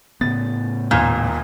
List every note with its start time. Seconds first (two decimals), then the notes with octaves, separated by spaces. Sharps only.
0.21 A2 C#3 B3 A6
0.91 D#1 D#2 A#2 F6